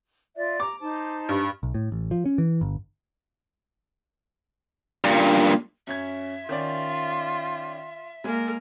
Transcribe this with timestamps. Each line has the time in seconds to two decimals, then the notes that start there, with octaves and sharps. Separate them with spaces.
0.36 F4 D5 E5
0.60 A#5 D6
0.81 D#4 C5 A5
1.29 G2
1.63 B1
1.74 A2
1.92 A1
2.11 F3
2.26 C#4
2.38 E3
2.61 G1
5.04 G2 A#2
5.87 F#2 C#4 E5 G#6
6.49 D#3 C#4 F4 D5
8.24 G#3 A#3 G#4 A#4